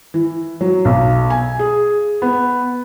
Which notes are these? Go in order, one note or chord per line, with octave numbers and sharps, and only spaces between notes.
E3
F#3
B1
G#5
G#4
B3